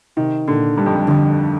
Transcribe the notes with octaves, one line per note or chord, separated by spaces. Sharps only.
C3 D#3
A#2 D3
G2
F2
G2
F2 D3